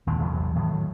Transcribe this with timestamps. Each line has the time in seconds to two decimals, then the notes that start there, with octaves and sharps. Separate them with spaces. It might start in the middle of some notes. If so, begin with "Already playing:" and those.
0.07 G#1 D#2 A#2 D3
0.21 A1 E2 C3 F#3
0.55 A2 D#3 F#3